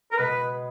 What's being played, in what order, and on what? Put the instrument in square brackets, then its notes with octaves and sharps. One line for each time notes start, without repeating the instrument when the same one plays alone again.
[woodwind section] A#4
[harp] B2 G#3 B3 [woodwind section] B4